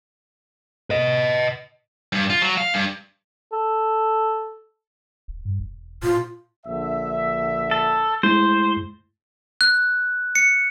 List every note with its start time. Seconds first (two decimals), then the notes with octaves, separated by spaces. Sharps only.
0.90 B4 D#5
2.13 G2
2.30 F4
2.42 F#3
2.58 F5
2.74 G2
3.53 A4
5.28 D#1
5.45 G2
5.60 E1
6.03 A#2 F4
6.66 A#1 D3 E5
7.71 A4
8.23 G#3 A3 E4 C5
9.61 F#6
10.35 C#7